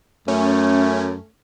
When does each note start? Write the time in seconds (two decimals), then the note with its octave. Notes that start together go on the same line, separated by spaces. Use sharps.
0.28 F#2 A3 C#4